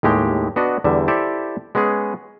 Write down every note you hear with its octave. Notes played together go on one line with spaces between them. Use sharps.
D#2 A2 G#3 G4 G5
B3 D4 F#4 D#5
E2 D3 G3 E5
E4 G4 A4 C5 D5 E5
G#3 B3 C#4 G#4